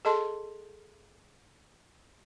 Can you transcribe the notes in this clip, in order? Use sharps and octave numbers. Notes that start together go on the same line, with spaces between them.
G#4 A4 D#5 A5 C6